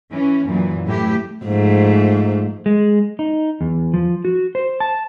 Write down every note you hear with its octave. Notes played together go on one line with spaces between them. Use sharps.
E3 C#4
F#2 A#2 E3
A2 E3 E4 G4
G#2 F3 A3
G#3
D#4
E2
F3
F#4
C5
A5